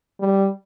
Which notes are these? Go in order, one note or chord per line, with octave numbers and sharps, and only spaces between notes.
G3